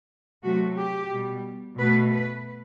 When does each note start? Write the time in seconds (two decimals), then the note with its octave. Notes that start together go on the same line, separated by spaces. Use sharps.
0.43 C3 F#3 A3 F#4
0.77 G4
1.11 B2 G3
1.78 B2 A3 B4
2.11 B4